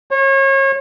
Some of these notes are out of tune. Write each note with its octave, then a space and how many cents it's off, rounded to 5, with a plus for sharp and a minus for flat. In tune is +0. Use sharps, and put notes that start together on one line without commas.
C#5 -35